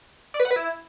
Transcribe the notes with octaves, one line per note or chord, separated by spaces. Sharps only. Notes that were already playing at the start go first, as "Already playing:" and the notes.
D5
B4
F#5
B4
E4